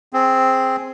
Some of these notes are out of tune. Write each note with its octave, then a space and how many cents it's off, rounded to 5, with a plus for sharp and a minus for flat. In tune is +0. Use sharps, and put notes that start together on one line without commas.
C4 +0 G#4 +0